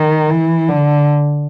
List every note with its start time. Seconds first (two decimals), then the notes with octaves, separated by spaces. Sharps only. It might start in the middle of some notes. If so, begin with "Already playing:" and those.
Already playing: D#3
0.30 E3
0.69 D3